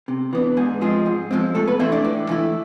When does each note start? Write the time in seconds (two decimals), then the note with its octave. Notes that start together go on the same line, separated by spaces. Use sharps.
0.08 C3
0.33 E3 B3 D4
0.57 G#2 G#4
0.81 F3 G#3 C4 G#4
1.06 G#2
1.31 F3 G#3 C4
1.55 A2 A3 A4
1.67 B3 B4
1.79 E3 A3 C4 E4 C5
1.92 D4 D5
2.04 A2
2.29 E3 A3 E4